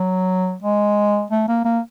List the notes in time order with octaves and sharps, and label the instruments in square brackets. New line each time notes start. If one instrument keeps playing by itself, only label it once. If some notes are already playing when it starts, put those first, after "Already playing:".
Already playing: [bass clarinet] F#3
G#3
A3
A#3
A#3